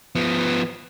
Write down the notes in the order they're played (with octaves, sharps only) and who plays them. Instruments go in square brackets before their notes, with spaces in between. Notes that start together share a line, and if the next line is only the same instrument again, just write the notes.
[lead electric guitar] F3 B3